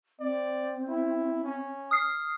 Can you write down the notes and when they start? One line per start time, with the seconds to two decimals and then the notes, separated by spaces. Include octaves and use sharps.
0.20 C4 D5
0.88 E4
1.44 C#4
1.91 D#6 F6 C7